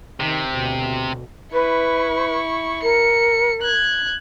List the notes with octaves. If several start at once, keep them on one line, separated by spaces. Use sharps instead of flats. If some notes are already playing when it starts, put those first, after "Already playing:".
C3 D#3
D2 B2
E4 B4 C#6
A#4 C#7
F#6 G#6